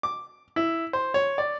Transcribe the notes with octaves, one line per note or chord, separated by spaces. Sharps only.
D6
E4
C5
C#5
D5